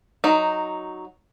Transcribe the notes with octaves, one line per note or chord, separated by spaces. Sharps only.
F#3 D#4